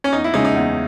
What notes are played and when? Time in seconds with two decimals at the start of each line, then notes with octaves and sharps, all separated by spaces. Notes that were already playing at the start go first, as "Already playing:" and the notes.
0.04 C#4
0.13 E2 D#4
0.24 E4
0.34 C#3 G#3 C#4 D#4 G#4
0.45 D#4
0.56 E2